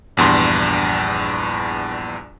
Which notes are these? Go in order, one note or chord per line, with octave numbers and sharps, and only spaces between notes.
A#1 E2 G2 C6